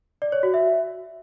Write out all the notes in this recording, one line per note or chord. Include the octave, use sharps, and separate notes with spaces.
D5
C#5
F#4
E5